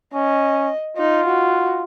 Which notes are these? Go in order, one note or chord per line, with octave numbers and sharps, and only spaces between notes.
C#4 D#5
D#4 F4
F#4